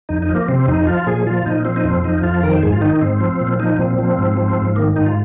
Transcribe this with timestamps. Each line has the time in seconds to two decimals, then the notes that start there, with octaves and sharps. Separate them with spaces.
0.09 F2 D#4
0.22 D#4
0.29 F3
0.35 A#3
0.48 C3 C4
0.67 F2 D#4
0.87 F3 F4
1.07 A#2 G#4
1.27 F3 F4
1.46 A#2 D#4
1.65 F3 C4
1.76 D#4
1.84 F2 C4
2.04 F3 D#4
2.23 F2 F4
2.43 D#3 A#4
2.53 C5
2.62 G#2 G#4
2.72 F4
2.81 D#3 D#4
3.01 G#2 C4
3.21 F3
3.41 A#2
3.59 F3 D#4
3.79 A#2 C4
3.99 F3
4.19 G#2
4.37 F3
4.57 G#2
4.76 D#3 A#3
4.96 G#2 D#4
5.06 F4